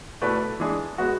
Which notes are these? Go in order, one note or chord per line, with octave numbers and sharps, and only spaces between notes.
B2 A3 E4 B4 D5
E3 G#3 D4 G#4
G#3 B3 F#4